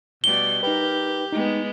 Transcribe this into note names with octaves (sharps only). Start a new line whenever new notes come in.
B2 G3 D5 G7
D#4 G4 A#4 B4
G#3 B3 D#4